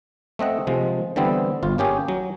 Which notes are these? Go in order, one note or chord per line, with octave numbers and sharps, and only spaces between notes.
A3 C4 D#5 F#5
C3 F3 G#3
D3 E3 G3 B3 C4
G1 F4
A#3 C#4 G4 G#4
F#3